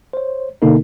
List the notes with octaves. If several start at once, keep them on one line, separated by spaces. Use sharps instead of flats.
C5 C#5
B2 D3 A#3 D#4 A4 A#4